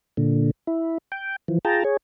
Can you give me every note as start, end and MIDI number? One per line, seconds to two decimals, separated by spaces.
0.17 0.51 46
0.17 0.51 50
0.67 0.98 64
1.12 1.36 79
1.48 1.59 52
1.48 1.59 53
1.65 1.83 65
1.65 1.83 68
1.65 1.83 79
1.65 1.83 81
1.65 1.83 82
1.84 1.97 68
1.84 1.97 73